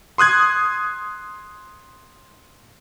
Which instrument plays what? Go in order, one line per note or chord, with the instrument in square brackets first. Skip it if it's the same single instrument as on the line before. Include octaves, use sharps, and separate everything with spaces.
[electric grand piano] C6 D#6 F#6 G#6